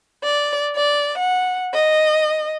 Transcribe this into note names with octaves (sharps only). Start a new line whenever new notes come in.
D5
D5
F#5
D#5